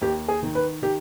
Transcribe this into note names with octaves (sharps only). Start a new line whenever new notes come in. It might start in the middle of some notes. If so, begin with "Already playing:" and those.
D#2 G4
G#4
D#3
B4
D#3 G4